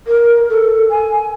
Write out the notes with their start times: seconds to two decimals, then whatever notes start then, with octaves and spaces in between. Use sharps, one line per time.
0.07 A#4
0.49 A4
0.90 G#5